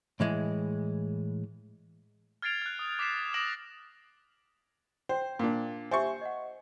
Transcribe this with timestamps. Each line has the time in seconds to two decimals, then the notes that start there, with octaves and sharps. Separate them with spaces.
0.20 A2 E3 G#3
2.42 F6 G#6 A6 C7 D7 F7
2.62 F6 F#6
2.79 D#6
2.99 D6 A6 B6 C7 E7
3.34 D6 D#6 A#6 D7 E7 F#7
5.09 C5 G5
5.39 A#2 D4
5.91 G4 C5 E5 G#5 C#6
6.21 D#5 F#5